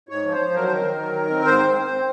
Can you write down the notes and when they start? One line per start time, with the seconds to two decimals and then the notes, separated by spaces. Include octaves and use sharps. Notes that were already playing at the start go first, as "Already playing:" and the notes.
0.09 G#2 C#5
0.24 F3
0.31 C5
0.39 F3
0.54 F#3 A#4
0.63 C5
0.69 D#3 A#4
0.84 D#3
1.00 F#3
1.15 D#3
1.30 C4
1.45 G#2 C5
1.60 C4
1.75 C4
1.91 C4